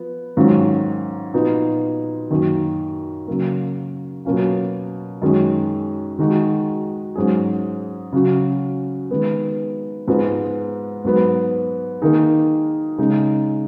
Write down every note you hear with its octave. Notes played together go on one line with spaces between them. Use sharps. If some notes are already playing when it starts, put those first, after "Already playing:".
Already playing: F3 B3
G#2 D#3 F#3 C#4 F4
A#2 F3 B3 D#4 F#4
F#2 D#3 A#3
C#3 F#3 A#3
B2 F#3 A#3 C#4 F4
F#2 D#3 G#3 C#4
D#3 G#3 D#4 F#4
G#2 F#3 C#4 G#4
C#3 F#3 C#4 F#4
D#3 G#3 B3
G#2 F3 G#3 B3
G#2 F#3 B3
D#3 A#3 D#4 G#4
C#3 G#3 D#4